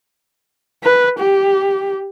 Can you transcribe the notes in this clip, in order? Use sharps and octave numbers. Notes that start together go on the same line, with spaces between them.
B4
G4